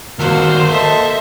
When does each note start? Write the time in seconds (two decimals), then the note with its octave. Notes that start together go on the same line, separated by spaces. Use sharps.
0.19 D#3 A#3 F#4 C5 F#5 E6 F6
0.71 A4 D#5 E5 A5